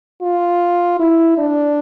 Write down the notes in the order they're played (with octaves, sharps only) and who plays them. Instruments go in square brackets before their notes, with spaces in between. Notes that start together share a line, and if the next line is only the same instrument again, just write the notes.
[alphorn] F4
E4
D4